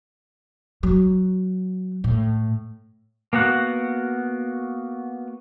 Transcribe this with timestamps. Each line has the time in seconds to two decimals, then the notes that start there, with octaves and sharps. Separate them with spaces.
0.83 F#3
2.04 A2
3.33 A#3 B3 F#4 F#5